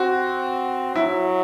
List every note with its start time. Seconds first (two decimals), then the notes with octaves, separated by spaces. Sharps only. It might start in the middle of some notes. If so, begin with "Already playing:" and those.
Already playing: C4 F#4
0.95 F#3 E4